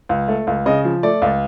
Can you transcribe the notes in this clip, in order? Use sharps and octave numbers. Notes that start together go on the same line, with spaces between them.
C#2
A3
C#2
C#3 D#5
F3
A3 D5
C#2